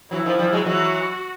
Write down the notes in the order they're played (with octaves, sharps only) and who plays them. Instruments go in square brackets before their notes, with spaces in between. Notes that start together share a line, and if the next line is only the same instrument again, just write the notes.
[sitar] E3 F#3 [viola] E4
[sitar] D#3 F3
F3 G3
F#3 G#3
[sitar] E3 F#3 [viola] F#4